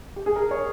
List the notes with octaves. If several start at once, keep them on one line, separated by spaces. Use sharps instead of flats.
G4
G#4
A#4
C#5